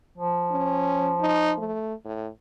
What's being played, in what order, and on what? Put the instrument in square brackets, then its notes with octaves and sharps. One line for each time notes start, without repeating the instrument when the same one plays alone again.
[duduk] F3
[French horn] C#4
D#4
A3
A2